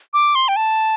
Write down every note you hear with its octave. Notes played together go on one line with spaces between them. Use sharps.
D6
C6
G5
A5